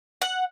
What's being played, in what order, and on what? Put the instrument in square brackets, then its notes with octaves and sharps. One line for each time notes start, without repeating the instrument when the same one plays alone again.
[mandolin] F#5